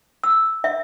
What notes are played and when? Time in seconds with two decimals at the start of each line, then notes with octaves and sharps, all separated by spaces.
0.24 E6
0.64 E5